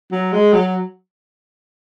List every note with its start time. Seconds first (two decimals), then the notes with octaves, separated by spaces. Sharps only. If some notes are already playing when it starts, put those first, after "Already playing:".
0.12 F#3
0.32 G#3
0.53 F#3